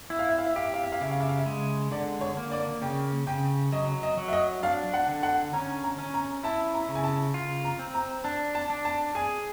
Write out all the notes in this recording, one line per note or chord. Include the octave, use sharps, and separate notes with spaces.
E4 E5
F5
E5
F5
E5
G4 F5
E5
F5
E5
F5
C#3 E5
F5
E5
F5
E5
G#3
D3 D5
C#5
A#3
D5
C#3 G5
C#3 G5
F#3 D#5
D#5
F#3
E5
D#5
D4 F5
F#5
D3
F#5
C#4 A#5
A#5
C#4
A#5
E4 A5
A#5
C#3
G#5
A5
F4
A#5
C4
A#5
D4 A5
A5
D4
A5
G#4 G#5